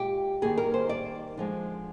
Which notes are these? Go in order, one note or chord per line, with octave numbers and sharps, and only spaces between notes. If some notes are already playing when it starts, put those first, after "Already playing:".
Already playing: A#2 G#3 G4
D#3 G3 A#3 G#4
A#4
C5
D5
D3 F3 G#3